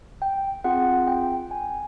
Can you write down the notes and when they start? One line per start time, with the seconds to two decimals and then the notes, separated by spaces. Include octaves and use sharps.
0.22 G5
0.64 C4 F4 G#4 F#5
1.07 G5
1.51 G#5